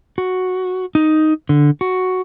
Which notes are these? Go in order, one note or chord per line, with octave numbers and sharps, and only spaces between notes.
F#4
D#4
D3
F#4